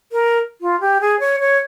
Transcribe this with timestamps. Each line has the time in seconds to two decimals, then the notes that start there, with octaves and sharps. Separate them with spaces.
0.12 A#4
0.61 F4
0.80 G4
1.01 G#4
1.20 C#5
1.40 C#5